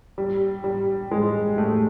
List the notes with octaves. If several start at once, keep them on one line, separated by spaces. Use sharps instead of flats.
G3
G3
G#3
A3